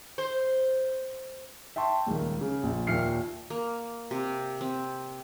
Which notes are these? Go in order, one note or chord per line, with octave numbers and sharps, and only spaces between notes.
C5
E5 G5 A5 C6 C#6
D#1 C#2 D#3
C#3
A#1
D#2 A#2 E5 F6 C7 C#7
A#3
C3
C4